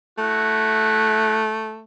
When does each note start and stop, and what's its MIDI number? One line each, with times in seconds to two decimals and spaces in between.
0.18 1.83 57
0.18 1.43 64
0.18 1.43 66